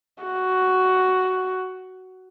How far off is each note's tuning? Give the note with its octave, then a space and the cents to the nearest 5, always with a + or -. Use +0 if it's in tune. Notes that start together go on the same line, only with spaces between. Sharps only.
F#4 +10